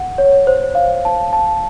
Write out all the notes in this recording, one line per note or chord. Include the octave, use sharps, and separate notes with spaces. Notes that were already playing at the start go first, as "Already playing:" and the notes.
Already playing: F#5
C#5
C5
F5
A5
A5